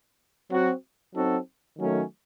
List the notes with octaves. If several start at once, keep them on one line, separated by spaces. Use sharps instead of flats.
F#3 C4 F#4
F#3 C4 D#4 F#4 A4
D#3 F#3 A3 C#4